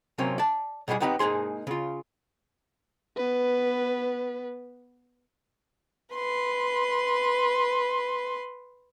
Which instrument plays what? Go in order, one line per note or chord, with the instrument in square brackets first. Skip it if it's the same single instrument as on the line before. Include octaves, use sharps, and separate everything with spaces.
[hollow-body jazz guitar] C3 F#3 A#3 C4 C#4
D5 A5
B2 G3 G#3 F4 G#4
B3 C4 D#4 G4 A#4 B4
G#3 A#3 D#4 G#4 C6
C#3 F4
[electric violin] B3 B4
[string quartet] B4 C6